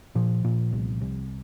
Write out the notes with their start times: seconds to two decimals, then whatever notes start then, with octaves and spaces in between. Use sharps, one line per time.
0.15 A#2 F3
0.44 A#2
0.73 C2
1.01 C2